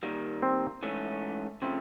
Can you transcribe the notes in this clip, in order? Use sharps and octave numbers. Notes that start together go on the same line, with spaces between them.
D#3 G3 A#3
C4
G#2 E3 A3 C#4
C#3 F3 A3 C4